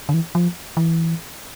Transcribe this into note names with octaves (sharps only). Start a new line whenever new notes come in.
D3
E3
F3
E3